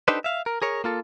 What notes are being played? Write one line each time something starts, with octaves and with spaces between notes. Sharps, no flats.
D4 D#4 G4 A4 B4 C5
E5 F5
A#4
G#4 A#4 C#5
A#3 F4 A4